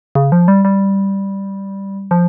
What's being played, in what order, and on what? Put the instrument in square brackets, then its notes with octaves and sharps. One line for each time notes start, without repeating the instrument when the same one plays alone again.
[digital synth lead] C#3
F3
G3
G3
F3